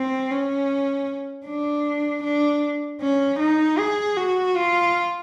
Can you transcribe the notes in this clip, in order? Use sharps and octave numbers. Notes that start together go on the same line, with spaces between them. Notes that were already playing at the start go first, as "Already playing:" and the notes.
Already playing: C4
C#4
D4
D4
C#4
D#4
G#4
F#4
F4